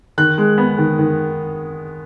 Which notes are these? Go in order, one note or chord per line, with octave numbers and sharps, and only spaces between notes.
D#3 F#6
G#3
B3
D#3
D#3